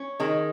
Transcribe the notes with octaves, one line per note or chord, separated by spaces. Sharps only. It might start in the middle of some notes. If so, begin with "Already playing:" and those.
Already playing: C#4
D#3 G#3